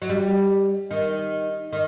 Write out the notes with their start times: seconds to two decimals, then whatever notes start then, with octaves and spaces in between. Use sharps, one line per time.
0.02 F#3
0.09 G3
0.91 D#3
1.72 D#3